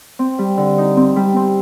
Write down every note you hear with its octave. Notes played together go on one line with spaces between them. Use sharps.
C4
G3
D3
D#4
C4
G3
C4